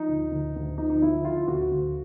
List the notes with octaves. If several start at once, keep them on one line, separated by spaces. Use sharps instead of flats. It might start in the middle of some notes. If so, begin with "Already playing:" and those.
Already playing: F3 D#4
D2
D2
D2
F3 D#4
D#4
F3 E4
D3 F4
D2 F#4
D2